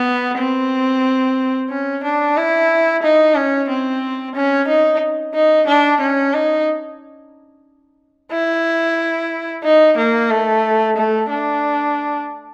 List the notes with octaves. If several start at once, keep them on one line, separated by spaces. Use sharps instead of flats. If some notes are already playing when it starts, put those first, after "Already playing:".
Already playing: B3
C4
C#4
D4
E4
D#4
C#4
C4
C#4
D#4
D#4
D4
C#4
D#4
E4
D#4
A#3
A3
A3
D4